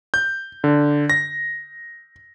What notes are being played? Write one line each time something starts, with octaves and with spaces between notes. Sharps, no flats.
G6
D3
A#6